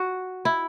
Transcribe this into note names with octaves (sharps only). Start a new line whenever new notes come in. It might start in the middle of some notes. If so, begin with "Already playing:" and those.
Already playing: F#4
E4